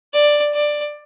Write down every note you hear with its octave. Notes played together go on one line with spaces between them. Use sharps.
D5
D5